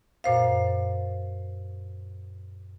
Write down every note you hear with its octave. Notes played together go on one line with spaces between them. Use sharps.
F#2 A#2 C5 F5